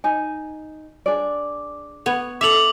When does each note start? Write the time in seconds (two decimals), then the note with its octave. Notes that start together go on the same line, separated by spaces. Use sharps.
0.04 D#4 G#5
1.06 D4 G#4 D5
2.06 B3 C#5
2.41 A4 E5 D6 F7 F#7